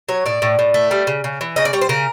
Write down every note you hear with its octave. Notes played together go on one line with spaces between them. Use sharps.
F#3 C#5
A2 D5
A2
A2
A3
G3
C#3
C#3
E3
C#3 D#5
D5
G3 C#5
C5
C#3 A#4